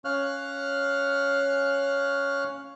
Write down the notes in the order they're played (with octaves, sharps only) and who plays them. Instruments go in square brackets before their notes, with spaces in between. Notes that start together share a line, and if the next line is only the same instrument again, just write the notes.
[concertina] C#4 C#5 F5 F6 F#6